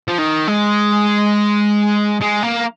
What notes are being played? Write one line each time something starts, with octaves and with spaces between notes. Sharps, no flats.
F3
D#3
G#3
G#3
A#3